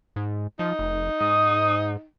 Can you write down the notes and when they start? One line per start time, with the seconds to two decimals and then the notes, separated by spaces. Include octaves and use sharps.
0.16 G#2
0.59 F3 D#4
0.79 F1
1.20 G#2 D#6